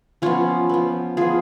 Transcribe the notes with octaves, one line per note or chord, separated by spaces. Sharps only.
F3 B3 C#4 F4
F3 B3
F3 B3 F4 G#4